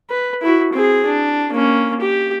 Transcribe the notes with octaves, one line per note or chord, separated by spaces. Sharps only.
B4
E4 F#4
C4 G#4
D4
A#3 C#4
G4